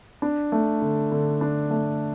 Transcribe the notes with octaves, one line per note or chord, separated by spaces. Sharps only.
D4
A3
D3
D3
D4
A3